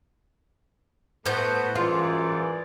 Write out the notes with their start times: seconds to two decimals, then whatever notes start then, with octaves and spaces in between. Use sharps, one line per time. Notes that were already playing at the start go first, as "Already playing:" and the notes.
1.26 A2 A3 B3 F#4 C5 G6
1.75 F#2 E3 G#3 F4 D5